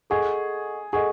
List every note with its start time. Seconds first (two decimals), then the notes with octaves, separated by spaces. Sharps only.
0.10 G#4 A4 D#5 F#5 C#6
0.93 G#4 A4 D#5 F#5 C#6